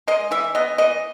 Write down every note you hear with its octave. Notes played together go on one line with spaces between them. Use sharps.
G#3 D#5
E3 E5
B3 D#5
E3 D#5